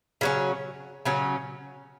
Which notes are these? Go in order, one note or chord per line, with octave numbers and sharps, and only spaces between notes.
C#3 F#3 C#4
C#3 F#3 C#4